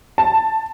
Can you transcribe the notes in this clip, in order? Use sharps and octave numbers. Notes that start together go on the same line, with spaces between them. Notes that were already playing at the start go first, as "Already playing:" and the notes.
A5